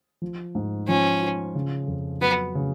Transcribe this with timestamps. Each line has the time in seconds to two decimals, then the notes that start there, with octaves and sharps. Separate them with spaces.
0.22 F3
0.55 G#2
0.88 F3 C#4
1.22 F4
1.55 C#3
1.88 F2
2.21 F#3 B3
2.55 C#3